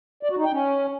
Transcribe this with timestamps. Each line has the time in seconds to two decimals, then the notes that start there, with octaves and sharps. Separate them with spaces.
0.23 D5
0.30 F#4
0.38 D#4
0.45 G5
0.52 C#4